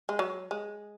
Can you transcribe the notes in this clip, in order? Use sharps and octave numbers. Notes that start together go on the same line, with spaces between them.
G#3
F#3
G#3